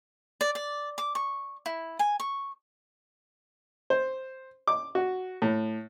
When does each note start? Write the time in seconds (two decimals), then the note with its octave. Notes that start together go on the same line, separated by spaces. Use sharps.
0.41 D5
0.55 D5
0.98 D6
1.15 C#6
1.66 E4
1.99 G#5
2.20 C#6
3.90 C5
4.67 D6
4.95 F#4
5.42 A2